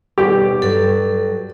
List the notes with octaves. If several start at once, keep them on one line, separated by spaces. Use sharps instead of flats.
D#2 B2 G3 G4
G2 F#3 A4